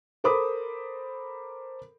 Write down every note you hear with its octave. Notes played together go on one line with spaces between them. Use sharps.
A4 A#4 C5 B5 D6 D#6